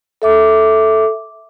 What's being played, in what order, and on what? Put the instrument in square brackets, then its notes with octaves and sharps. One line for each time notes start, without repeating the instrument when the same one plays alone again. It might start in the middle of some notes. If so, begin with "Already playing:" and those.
[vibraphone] A4 E5 D6